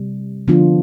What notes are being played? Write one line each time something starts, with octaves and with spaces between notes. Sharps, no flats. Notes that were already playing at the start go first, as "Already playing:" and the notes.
Already playing: C3 G3
D3 F3 B3 D4 F4